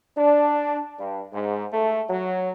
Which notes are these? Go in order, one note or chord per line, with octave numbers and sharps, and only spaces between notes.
D4
G2
G#2
A3
F#3